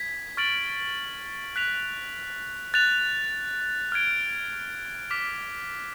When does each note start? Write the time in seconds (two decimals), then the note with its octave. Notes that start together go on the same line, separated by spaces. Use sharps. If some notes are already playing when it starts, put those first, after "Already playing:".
Already playing: G#6 B6
0.37 C#6 F6 A6 D7 F#7
1.56 F#6 B6 F7
2.74 F#6 A6 F7
3.92 F6 G#6 D7
5.10 D6 F6 B6 F7